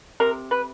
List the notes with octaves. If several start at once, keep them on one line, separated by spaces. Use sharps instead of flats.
C3 A#4
B4